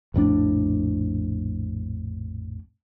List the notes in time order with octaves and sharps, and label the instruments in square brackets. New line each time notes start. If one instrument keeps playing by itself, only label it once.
[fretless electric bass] A#1 F2 A2 D4